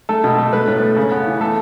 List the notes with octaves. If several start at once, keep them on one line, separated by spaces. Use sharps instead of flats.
A3 A4
B2
A3
A3 B4
A2
A3
C#3
B3
E3
A3 A4